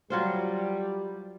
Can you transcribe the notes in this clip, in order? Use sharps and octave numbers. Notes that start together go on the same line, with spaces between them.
F#3 G3 F4 C5